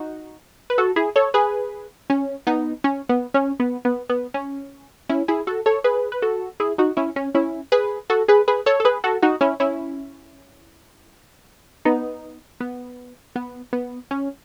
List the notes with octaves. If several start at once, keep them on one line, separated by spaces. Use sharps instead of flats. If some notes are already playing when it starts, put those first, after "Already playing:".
Already playing: D#4 F#4
B4
F#4 A4
E4 G#4
A4 C#5
G#4 B4
C#4
B3 D#4
C#4
B3
C#4
B3
B3
B3
C#4
C#4 E4
E4 G#4
F#4 A4
A4 C#5
G#4 B4
B4
F#4 A4
E4 G#4
D#4 F#4
C#4 E4
C#4
C#4 E4
G#4 B4
F#4 A4
G#4 B4
G#4 B4
A4 C#5
A4
G#4 B4
F#4 A4
D#4 F#4
C#4 E4
C#4 E4
B3 D#4
B3
B3
B3
C#4